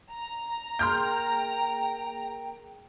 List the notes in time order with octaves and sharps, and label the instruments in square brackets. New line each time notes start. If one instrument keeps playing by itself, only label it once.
[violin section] A#5
[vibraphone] A#3 G#4 A#4 [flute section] G5 [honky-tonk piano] C6 F6 G6